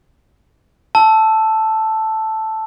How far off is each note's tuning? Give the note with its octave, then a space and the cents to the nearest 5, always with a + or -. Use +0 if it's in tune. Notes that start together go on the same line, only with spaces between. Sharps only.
A5 +0 E6 +0